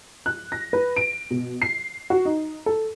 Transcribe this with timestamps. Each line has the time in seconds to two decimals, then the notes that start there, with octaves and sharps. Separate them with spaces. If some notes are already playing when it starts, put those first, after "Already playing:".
0.26 F#6
0.52 A#6
0.73 B4
0.97 D7
1.31 B2
1.62 C7
2.10 F#4
2.25 D#4
2.66 A4